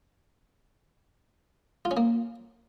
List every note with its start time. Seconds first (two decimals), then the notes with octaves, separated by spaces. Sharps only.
1.85 F4
1.91 C#4
1.97 A#3